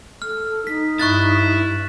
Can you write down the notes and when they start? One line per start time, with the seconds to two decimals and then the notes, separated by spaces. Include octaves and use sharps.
0.22 A4 F6
0.67 D#4 B6
0.99 G2 E4 C#6 F#6 A6